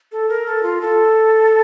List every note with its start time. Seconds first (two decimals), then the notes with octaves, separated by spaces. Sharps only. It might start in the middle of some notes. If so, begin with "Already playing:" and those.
0.12 A4
0.29 A#4
0.46 A4
0.63 F4
0.81 A4